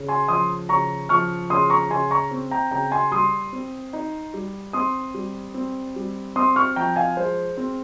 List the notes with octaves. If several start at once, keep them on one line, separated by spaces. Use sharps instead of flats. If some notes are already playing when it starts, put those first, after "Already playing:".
Already playing: C#3
G#5 C6
F3 C6 D#6
C#3 A#5 C#6
F3 C#6 F6
C#3 C6 D#6
A#5 C#6
C#3 G#5 C6
A#5 C#6
C4
G5 A#5
C#3 G5 A#5
G#5 C6
G3 C6 D#6
C4
D#4
G3
C4 C6 D#6
G3
C4
G3
C4 C6 D#6
C#6 F6
F3 G5 A#5
F5 G#5
G#3 C5
C4